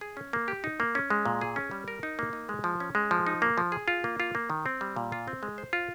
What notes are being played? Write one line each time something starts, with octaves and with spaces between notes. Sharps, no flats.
G#4
C#4
A#3
G4
D#4
A#3
C#4
G#3
A#2
G#4
C#4
G3
A#4
D#4
A#3
D#4
G#3
F3
C#4
G#3
F3
D#4
A#3
F3
G#4
F4
A#3
F4
A#3
D#3
C4
G3
A#2
F4
C4
G#3
C5
F4